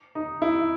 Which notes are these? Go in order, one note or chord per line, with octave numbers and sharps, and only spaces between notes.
D#4
E4